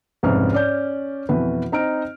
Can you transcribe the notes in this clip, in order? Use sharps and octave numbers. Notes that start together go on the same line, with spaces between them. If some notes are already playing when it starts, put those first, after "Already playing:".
C2 F2 G#2 C#3 B4 F6
C#4 D5 G6
F2 B2 E3 F#4 B4
C4 D#4 A#5 F6 D7